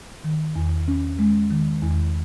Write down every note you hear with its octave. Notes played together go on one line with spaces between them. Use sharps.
D#3
E2
C#4
G#3
D#3
E2